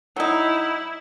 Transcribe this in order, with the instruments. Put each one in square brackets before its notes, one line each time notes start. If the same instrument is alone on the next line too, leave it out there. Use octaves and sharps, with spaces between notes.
[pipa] F#3 D#4 [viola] E4